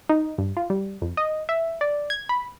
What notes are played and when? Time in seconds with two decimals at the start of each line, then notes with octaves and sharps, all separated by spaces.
0.10 D#4
0.38 G2
0.57 F4
0.70 G3
1.02 F2
1.17 D#5
1.49 E5
1.81 D5
2.10 G#6
2.29 B5